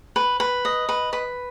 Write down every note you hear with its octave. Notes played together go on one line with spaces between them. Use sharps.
B4
B4
D#5
B4
B4